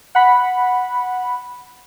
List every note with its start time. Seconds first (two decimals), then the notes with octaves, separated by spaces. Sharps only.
0.15 F#5 B5